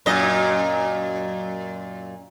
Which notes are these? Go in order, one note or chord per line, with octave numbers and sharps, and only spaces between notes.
F#2 A#2 D#5